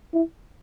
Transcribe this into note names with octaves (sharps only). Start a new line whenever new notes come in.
E4